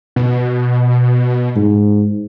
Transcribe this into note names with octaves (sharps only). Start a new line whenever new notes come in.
B2
G#2